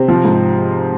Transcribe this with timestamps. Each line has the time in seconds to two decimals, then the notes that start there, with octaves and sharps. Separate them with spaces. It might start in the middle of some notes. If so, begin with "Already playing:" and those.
Already playing: C3 C5
0.08 F3
0.25 G#2